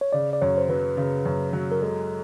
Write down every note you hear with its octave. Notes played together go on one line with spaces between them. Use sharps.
C#5
C#3 D5
D5
F#2 C#5
C5
F#3 B4
C#3
F#2
F#3
A#4
G#3 A4